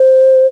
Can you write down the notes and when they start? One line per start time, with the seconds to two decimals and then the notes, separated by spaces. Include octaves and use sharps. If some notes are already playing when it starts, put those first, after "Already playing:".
Already playing: C5